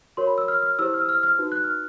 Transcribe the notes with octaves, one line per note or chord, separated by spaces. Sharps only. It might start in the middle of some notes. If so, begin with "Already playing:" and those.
F#4 A#4 C#5 C6
B5
E6
F6
F6
E4 G4 C5 E6
F6
E6
F6
F6
D#4 F#4 B4
F#6
F6